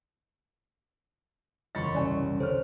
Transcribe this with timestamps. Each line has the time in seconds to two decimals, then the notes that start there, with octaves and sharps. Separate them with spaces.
1.75 F#1 E2 C5 C#5 D#5 B5 C#6 A6
1.95 C2 C#3 G3 C#4
2.40 D3 C5 C#5 F6